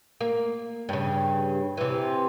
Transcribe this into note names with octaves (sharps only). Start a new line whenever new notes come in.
A#3
G2 C#3
C3 E3